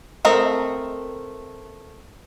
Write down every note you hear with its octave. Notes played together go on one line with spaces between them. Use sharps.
A3 C4 A4 A#4 D#5